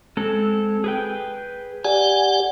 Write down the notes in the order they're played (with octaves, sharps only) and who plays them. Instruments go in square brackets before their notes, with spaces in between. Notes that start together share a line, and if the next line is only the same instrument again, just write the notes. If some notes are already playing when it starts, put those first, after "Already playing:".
[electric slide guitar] G#3 C4 A4
G#4 B4 G5
[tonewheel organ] G4 D5 F#5 [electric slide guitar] G#5